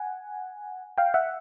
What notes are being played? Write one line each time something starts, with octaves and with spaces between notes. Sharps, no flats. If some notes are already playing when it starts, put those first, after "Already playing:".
Already playing: F#5 G#5
F5 G5
E5 F#5